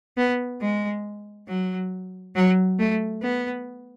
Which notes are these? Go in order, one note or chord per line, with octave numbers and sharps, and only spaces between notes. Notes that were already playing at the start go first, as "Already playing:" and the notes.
B3
G#3
F#3
F#3
A3
B3